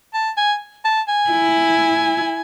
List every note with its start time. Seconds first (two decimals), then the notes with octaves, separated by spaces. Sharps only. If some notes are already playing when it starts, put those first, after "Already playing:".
0.14 A5
0.37 G#5
0.85 A5
1.09 G#5
1.31 E4